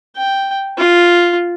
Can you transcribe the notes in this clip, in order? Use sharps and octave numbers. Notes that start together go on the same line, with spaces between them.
G5
F4